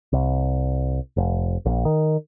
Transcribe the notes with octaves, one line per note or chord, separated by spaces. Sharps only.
C2
F1
A#1
D#3